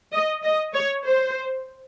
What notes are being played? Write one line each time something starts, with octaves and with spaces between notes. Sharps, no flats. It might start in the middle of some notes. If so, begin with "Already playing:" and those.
D#5
D#5
C#5
C5